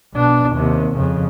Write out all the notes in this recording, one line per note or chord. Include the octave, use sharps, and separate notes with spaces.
B2 D4
D#2 C3
F2 C#3